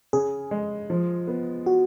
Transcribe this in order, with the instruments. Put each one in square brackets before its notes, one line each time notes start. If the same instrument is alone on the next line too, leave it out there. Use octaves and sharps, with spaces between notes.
[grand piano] C#3 [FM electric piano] G#4
[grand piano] G#3
F3
B3
[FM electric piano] F#4